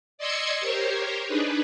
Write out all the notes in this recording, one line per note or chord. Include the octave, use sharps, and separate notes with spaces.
D5 D#5 C6 E6 G#6 C#7
G4 A#4 C5 C#5
D4 D#4 G#4 B4